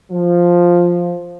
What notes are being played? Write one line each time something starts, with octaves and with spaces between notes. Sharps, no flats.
F3